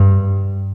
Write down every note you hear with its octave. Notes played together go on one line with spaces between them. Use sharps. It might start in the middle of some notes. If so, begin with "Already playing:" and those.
Already playing: G2